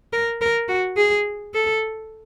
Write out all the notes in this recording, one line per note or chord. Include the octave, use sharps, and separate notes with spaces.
A#4
A#4
F#4
G#4
A4